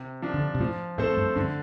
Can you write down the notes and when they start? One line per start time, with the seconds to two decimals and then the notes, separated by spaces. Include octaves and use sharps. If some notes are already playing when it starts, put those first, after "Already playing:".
Already playing: C3
0.22 F3 D4
0.34 D3
0.55 C3
0.60 A2 F3
0.98 A2 A3 C4 A4 C5
1.17 G2
1.36 G2 D3